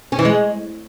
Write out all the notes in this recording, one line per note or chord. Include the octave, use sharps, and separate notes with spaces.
C#4
E3
G#3